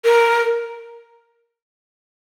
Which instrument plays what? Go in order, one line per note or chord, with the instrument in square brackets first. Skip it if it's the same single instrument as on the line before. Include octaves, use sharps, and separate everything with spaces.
[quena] A#4